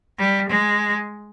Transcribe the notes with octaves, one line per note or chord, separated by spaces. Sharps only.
G3
G#3